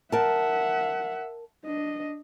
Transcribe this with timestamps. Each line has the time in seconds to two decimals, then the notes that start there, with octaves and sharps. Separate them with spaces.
0.12 A#4 E5 F#5 A5
1.65 D4 D#5